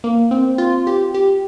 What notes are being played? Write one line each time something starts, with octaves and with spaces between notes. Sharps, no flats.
A#3
C4
F4
G4
G4